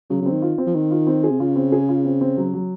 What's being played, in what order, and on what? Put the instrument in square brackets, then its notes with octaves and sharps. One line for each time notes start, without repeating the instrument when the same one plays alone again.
[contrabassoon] C#3 [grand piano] F#3
[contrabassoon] C#3 [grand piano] C4
[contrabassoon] D#3
[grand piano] F4
C4
[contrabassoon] F3
[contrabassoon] D#3 [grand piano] C4
[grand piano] F4
C4
G#4
[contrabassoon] C3
[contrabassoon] C#3 [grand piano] F4
[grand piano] C4
G#4
F4
C4
C4
F#3
F#3